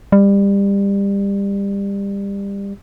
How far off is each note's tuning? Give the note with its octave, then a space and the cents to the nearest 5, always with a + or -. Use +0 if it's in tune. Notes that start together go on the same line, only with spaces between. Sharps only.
G3 +25